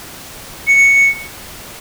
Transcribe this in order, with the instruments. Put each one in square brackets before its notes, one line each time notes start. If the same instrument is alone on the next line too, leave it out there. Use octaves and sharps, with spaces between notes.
[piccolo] C#7